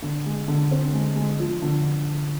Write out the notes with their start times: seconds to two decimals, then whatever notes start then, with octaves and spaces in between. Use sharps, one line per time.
0.02 D3
0.26 G#3
0.48 D3
0.71 C4
0.93 G#3
1.16 G#3
1.39 F3
1.62 D3